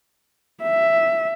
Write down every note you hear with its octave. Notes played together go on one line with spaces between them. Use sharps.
E5